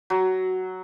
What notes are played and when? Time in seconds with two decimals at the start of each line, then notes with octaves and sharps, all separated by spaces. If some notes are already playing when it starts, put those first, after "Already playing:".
0.10 F#3